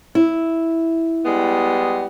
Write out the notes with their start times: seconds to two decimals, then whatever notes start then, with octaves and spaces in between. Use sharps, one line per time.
0.15 E4
1.25 G3 G#3 B3